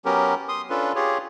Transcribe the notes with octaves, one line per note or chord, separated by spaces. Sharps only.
F#3 B3 C#4 G4 A#4
C6 D#6
C#4 D4 F4 A4 B4
F4 G4 G#4 C#5